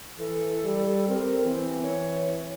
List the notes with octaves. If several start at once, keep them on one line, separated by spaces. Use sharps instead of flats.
E3 A4
G3
C4 A#4
E3 C4
C#5